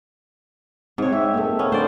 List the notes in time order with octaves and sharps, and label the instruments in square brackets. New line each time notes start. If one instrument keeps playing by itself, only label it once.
[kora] G#2 C#5 [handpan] C4
[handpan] E5
A#3 A4
[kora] B3 C#4
[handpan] A3 D4 [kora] C5 D5